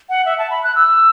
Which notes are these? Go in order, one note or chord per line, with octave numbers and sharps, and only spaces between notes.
F#5
E5
A5
B5
F#6
E6